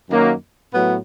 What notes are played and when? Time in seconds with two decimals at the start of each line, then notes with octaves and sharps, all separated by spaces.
0.10 F#2 D#3 F#3 A#3
0.73 A2 F#3 B3